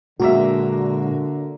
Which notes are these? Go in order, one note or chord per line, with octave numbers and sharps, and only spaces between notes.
A#2 D3 F#3 G#3 A#3 F#4 E5